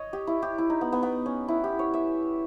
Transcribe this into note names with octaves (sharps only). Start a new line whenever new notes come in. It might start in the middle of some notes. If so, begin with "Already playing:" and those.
Already playing: C#5 D#5
G4
E4
G4
E4
D#4
B3
B3
B3
C#4
E4
G4
C#5
E5